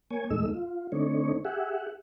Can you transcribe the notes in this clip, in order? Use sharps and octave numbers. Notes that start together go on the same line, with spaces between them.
A#3 C#5 G#5
E2 A#2 G#3 A3 D#4 E6
F4
D3 A3 C4 D4 D#4 C#5
G4 G#4 E5 F#5